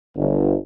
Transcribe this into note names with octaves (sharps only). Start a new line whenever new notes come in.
G1